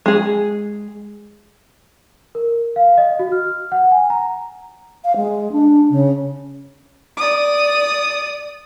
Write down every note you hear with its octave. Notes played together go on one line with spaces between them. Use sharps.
G#3 G#4
A#4
F5
D#5
F#4
F6
F#5
G#5
A#5
F5
G#3
D4
C#3
D5 D#6